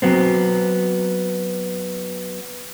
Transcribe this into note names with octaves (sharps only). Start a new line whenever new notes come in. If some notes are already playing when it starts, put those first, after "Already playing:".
F#3 B3 C4